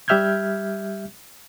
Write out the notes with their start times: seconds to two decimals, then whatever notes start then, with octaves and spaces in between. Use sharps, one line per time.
0.08 G3 G4 E5 F6 G6 G#6